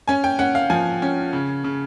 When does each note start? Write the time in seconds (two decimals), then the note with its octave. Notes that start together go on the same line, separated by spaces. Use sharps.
0.08 C#4 G#5
0.24 G5
0.39 C#4 F#5
0.55 F5
0.70 F3 G#5
1.02 C#4
1.33 C#3
1.64 C#3